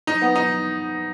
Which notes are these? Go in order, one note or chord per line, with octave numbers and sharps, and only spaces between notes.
D#4
B3
D#4